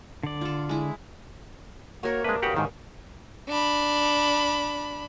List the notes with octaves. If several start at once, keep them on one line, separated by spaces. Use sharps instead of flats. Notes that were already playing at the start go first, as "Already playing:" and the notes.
D3 D5
F4 A4
G#3 E4
A#3 F#4 A#4 C#5
G#3 A3 C4 D4 B4
E2 G2 C#3 F#4 G4 F#5
G#2 D#3 G3
D4 B5